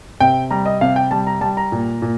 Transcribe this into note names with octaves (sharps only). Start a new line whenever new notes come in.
C3 G5
G3 A#5
D#5
C3 F5
G5
G3 A5
A#5
G3 A5
A#5
A#2
A#2